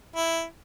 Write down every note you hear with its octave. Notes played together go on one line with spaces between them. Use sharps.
E4